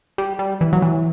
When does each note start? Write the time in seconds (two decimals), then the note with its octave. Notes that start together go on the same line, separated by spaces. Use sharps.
0.18 G3
0.39 G3
0.61 E3
0.73 F#3
0.82 E3